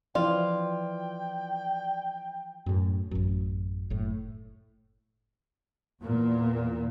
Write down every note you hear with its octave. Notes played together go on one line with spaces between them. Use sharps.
E3 F3 E4 F4 D5 G5
F#2 A2
A1 F#2
F#1 A2
E2 A#2